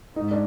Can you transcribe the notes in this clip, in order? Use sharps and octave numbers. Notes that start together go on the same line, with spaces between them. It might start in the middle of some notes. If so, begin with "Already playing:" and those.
G#2 D#4
D4